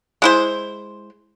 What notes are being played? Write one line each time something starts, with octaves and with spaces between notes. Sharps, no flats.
G#3 E4 C5